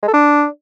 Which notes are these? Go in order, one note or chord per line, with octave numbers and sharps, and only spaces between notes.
G#3
A4
D4